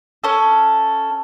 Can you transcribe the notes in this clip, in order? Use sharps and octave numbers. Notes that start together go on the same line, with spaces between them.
C#4 A4